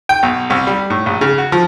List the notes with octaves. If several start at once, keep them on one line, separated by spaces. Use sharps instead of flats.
G5
B1
C2
G3
A2
A#1
C#3
F#4
F3